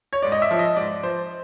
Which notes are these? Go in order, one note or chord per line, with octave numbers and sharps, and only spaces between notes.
C#5
G#2 D5
D#5
E5
F3
D#5
G#2 D5
F3 C5